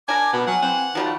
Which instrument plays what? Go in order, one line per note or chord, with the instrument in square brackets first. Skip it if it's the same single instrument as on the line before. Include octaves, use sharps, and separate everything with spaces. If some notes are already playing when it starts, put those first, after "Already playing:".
[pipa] D4 A#4 [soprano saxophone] G#5 [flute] D6
[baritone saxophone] B2 [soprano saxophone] B3
[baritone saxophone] F#3 [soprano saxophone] F#5 [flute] G#5
[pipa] E3 [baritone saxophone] C4 [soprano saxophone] F#5
[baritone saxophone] D#3 [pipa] F3 G3 A3 [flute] F#4